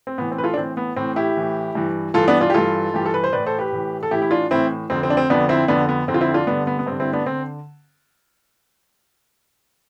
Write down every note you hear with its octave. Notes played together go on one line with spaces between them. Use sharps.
C4
A2 E3 B3
C4
B4
F4 A4
D4
A2 E3 C4
B3
A2 E3 C4
E4 G4
A2 E3
G2 E3
G2 E3 F4 A4
B3 D4
D4 F4
G4
G2 E3 F4 A4
G2 E3 G4
A4
B4
C5
A2 E3 B4 D5
A4 C5
G4 B4
A2 E3
A4
A2 E3 E4 G4
E4
D4 F4
A2 E3 C4 E4
F2 D3 C4
C4
D4
C4
F2 D3 B3 D4
C4 E4
F2 D3 B3 D4
B3
F2 D3 C4
F4
C4 E4
D4 F4
G2 D3 B3 D4
B3
B3
G2 C4
D3
C4 E4
B3 D4
D3 C4